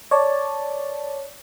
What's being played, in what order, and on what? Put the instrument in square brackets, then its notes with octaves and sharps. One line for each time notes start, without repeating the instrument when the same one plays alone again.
[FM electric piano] C#5 D5 A5